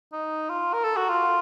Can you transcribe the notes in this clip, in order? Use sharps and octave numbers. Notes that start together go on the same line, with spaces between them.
D#4
F4
A#4
A4
F#4
F4